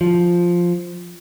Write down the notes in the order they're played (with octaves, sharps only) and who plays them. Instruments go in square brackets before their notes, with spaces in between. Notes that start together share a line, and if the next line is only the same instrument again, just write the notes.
[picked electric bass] F3